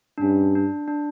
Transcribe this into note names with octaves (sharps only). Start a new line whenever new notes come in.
D4
G2 C#4
D4
D4